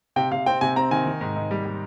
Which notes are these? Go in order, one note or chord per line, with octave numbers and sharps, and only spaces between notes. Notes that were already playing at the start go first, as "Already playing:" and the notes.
C3 G5
C3 F5
C4 G5
C3 G#5
C4 A#5
D#3 G#5
D#3
G#2
G#2
G3
G3